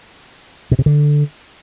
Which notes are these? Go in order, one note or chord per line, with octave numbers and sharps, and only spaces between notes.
B2
C3
D3